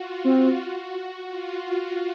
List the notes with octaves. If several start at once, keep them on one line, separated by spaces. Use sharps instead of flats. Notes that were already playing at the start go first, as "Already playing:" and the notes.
Already playing: F4 F#4
C4 F4
F#4
F#4
F4